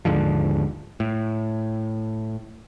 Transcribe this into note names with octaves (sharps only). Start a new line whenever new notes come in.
D#2 G#2 D3 F3
A2